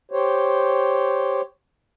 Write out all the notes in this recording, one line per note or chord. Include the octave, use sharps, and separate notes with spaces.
G4 C5 C#5